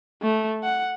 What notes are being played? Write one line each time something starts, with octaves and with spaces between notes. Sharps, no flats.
A3
F#5